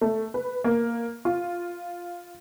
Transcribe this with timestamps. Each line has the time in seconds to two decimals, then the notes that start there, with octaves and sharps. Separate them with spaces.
0.01 A3
0.34 B4
0.64 A#3
1.25 F4